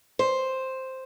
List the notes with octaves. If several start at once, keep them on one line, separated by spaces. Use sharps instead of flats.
C5